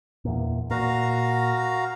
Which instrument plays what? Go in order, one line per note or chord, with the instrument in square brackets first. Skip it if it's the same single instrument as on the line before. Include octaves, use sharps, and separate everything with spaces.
[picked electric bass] E2 A#2
[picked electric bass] A#2 [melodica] F#4 F5 A#5